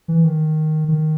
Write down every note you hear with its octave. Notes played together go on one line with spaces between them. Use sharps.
E3
D#3
D#3